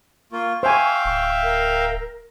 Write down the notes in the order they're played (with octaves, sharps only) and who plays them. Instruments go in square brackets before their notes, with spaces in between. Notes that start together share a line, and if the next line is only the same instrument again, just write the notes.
[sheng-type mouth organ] A#3 F4 [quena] C#6
[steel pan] C5 G#5 [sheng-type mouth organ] E5 F5 G5
[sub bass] D1
[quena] A#4